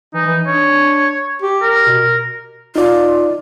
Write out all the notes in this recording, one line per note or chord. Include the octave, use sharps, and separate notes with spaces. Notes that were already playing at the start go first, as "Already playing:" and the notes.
E3 D#4
E3
D4 C#5
G4
A#4
B2
D#4 F4 D5